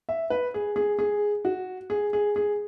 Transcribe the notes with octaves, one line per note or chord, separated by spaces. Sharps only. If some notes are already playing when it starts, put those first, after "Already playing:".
E5
B4
G#4
G#4
G#4
F#4
G#4
G#4
G#4